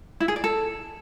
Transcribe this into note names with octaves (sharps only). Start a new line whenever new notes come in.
E4
G#4
D5
A4